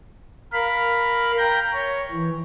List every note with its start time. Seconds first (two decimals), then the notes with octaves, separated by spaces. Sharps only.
0.53 A#4 F5 B5
1.38 G5 A#5 G6
1.73 C#5
2.11 E3